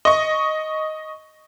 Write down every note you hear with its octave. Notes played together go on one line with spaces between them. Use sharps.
D#5 C#6